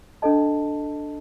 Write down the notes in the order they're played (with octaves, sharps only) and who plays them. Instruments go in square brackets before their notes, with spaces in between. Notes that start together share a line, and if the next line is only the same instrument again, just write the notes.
[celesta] D4 A4 D#5 A5